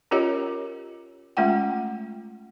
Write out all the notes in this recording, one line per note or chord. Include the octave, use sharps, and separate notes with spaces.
C#4 F4 G4 A#4 C#5 D#5
G#3 A3 C#4 F4 F#5 G5